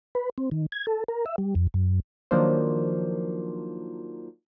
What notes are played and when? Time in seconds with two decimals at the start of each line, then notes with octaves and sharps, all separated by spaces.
0.15 B4
0.38 C4
0.51 D#3
0.72 G#6
0.87 A4
1.08 A#4
1.26 E5
1.38 G3
1.55 F2
1.74 F#2
2.31 D#3 F3 F#3 A#3 D4 C5